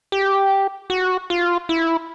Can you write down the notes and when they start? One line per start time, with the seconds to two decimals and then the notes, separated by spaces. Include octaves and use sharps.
0.12 G4
0.90 F#4
1.30 F4
1.69 E4